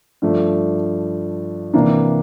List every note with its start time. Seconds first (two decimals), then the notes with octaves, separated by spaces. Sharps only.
0.22 G2 F3 A3
1.74 C3 E3 A#3 D4